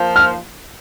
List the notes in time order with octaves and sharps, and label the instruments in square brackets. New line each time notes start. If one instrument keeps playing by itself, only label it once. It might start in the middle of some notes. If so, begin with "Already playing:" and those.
Already playing: [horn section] F3 A#3 F4 C5
[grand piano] F6